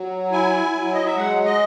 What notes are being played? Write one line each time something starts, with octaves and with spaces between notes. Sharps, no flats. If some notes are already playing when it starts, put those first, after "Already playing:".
Already playing: F#3
E4 G#5
F#3
D#5
E5
G#3 F#5
D#5